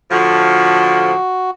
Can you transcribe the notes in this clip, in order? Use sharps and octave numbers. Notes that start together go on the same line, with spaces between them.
A2 D3 F3 F#4